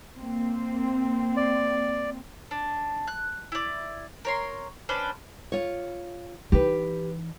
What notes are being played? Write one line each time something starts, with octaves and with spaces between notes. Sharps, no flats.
A#3 C4
D5
D4
F#6
E4 D5
A#4 C#5 C6
C#4 D4 B4 C5
F4 C#5
E3 D#4 G4 B4